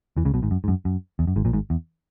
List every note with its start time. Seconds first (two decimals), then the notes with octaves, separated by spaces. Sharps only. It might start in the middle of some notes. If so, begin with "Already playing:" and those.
0.17 E2 E3
0.25 C#2 C#3
0.34 B1 B2
0.42 G#1 G#2
0.51 F#2
0.64 G#2
0.68 F#2
0.85 F#2
1.19 E2
1.27 F#2
1.36 G#1 G#2
1.45 A#1 A#2
1.53 G#1 G#2
1.70 E2